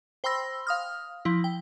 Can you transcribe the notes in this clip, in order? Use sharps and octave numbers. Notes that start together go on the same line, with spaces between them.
C5 G5 B5 C6 E6 A#6
F5 D#6 F6
F3 E4
G5